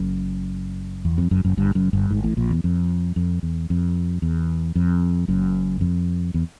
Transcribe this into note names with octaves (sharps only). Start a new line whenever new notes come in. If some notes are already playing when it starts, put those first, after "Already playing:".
Already playing: F#1 F#2
E2
F2
F#1 F#2
F#1 F#2
G1 G2
F#1 F#2
G1 G2
G#1 G#2
A1 A2
A#1 A#2
E2
F2
F2
E2
F2
E2
F2
F#1 F#2
F2
E2